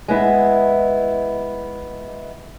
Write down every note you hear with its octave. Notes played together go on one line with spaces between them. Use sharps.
G#3 B3 E4